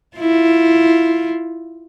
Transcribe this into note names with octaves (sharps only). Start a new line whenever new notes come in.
E4 F4